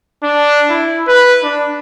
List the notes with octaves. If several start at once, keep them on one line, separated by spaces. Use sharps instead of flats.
D4
E4
B4
D4